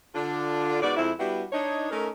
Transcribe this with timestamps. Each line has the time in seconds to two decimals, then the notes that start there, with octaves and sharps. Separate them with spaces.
0.15 D3 D4 F4
0.82 G#2 B3 F#4 D5
0.96 F2 G#3 C4 E4
1.19 G3 B3 D4 E4 F#4 G4
1.52 D4 D#4 C#5
1.91 A3 C#4 D#4 A#4